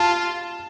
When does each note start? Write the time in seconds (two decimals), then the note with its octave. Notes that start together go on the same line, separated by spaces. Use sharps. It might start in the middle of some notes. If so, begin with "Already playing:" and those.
Already playing: F4 A5